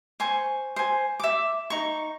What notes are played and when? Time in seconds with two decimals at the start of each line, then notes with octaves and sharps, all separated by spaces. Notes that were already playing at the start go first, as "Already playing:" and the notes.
0.20 C5 G#5 C#6
0.76 C5 G#5
1.20 E5 D6
1.70 D#4 C#6